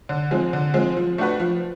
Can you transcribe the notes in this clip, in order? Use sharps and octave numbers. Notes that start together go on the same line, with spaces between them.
D3
F3 G#3 C4
D3
F3 G#3 C4
F3
A3 D4 F#4 B4
F3